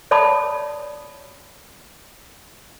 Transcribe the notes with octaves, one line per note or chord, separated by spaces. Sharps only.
C#5 D5 A5 B5 D#6